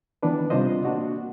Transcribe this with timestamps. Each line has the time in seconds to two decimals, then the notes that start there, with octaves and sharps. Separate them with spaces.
0.23 D#3 E3 B3 D4 B4
0.50 C3 G3 D4 F4 C5 D#5
0.85 A#3 D4 F#4